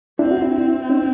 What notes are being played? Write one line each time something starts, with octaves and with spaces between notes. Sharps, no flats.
C4 D4 E4
E4 F#4
D4 E4
C4
C#4 D#4